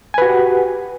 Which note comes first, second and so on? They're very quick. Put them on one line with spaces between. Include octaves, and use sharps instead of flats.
G#5 B4 F#4 G4 F#5